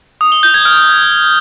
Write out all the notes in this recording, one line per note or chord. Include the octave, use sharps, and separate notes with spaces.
D#6
G7
G6
G#6
F6